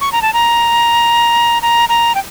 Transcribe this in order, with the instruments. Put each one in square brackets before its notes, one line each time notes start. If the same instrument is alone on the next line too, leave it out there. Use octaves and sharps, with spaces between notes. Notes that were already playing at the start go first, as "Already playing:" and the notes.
[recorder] C#6
A#5
A5
A#5
A#5
A#5
G5